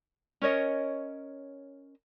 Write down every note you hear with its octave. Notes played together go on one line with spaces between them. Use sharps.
C#4 A#4 C#5 D#5